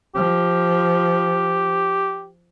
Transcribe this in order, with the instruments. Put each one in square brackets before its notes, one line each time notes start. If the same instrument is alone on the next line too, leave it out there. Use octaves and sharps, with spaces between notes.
[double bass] F3 [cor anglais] G4